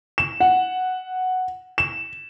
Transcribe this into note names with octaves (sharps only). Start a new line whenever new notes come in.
E7
F#5
E7